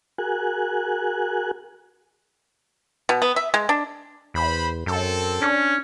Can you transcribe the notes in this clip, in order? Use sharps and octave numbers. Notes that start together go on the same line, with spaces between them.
F#4 G#4 A#4 G#5 F#6
B2
B3
E5
G#3
D4
E2 B4 C5 B5
F#2 C4 A4
C#4 D4